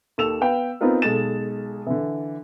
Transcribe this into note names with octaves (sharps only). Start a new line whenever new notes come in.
D#2 A4 E6 E7 F7
B3 B4 F5 G5
B3 C4 D#4 F4 A#4
B1 G#3 A4 A6 E7
D3 E3